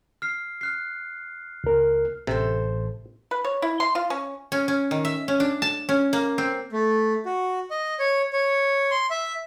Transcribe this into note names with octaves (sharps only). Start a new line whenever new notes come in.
F6 C7
F6 F#6 C7
C#2 A#4
A1 C3 A4 C5
B4
C#5
E4
C6
F4
C#4
C#4
C#4
D#3
E5
C#4
D4
A5
C#4
A#3
C4
A3
F#4
D#5
C#5
C#5
C6
E5